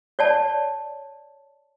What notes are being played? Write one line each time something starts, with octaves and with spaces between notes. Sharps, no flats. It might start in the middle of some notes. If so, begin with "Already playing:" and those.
C#5 D5 A5